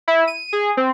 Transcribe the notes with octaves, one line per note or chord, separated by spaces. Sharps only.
E4
D#7
G#4
C4